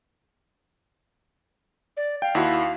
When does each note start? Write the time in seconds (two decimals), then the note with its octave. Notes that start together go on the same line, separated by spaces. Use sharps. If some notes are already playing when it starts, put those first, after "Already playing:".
1.97 D5
2.22 F5 G5
2.35 D#2 E4 F#4